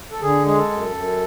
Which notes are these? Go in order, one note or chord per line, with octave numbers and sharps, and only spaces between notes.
A4
D3 G#4
G#3 G#4
A4
F#2
F#2